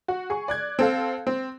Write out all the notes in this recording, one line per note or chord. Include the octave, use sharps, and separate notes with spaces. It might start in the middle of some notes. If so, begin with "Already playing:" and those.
F#4
G#4 C#6
D5 F#6 G#6
C4 A4 F5
C4